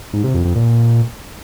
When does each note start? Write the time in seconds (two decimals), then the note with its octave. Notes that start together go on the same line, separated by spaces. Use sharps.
0.13 G#2
0.24 C3
0.34 F2
0.45 F2
0.55 A#2